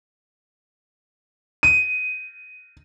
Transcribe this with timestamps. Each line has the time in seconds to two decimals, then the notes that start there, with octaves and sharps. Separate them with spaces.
1.63 D#7